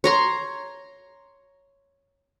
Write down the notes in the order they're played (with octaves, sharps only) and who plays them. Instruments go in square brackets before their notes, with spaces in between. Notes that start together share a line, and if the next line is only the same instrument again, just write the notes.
[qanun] C#5 A#5 C6